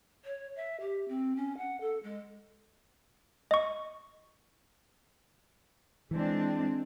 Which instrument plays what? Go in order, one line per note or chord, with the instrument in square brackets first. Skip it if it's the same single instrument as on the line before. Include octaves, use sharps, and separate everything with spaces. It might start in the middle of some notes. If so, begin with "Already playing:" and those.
[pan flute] C#5
E5
G4
C4
C#4
F#5
A4
G#3
[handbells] D#5 C#6
[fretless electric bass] E3 [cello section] G#3 C4 D4